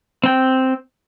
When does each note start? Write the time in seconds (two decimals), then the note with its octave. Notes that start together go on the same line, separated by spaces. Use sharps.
0.24 C4 G5